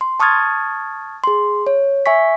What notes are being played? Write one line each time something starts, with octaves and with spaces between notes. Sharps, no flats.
C6
A5 C#6 D#6 F6 G#6 A6
G#4 C6
C#5
E5 G#5 C#6 B6